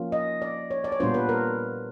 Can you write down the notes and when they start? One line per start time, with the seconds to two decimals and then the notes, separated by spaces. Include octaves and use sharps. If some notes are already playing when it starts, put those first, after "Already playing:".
Already playing: F3 A#3 C#4 F4
0.12 D#5
0.42 D5
0.71 C#5
0.84 D5
0.92 C#5
1.00 A#2 G3 B3 D4 F4 C5
1.14 B4
1.29 A#4